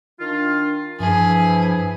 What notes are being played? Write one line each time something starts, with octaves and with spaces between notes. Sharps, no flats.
D#3 D4 F4
G2 E3 F3 E4 G#4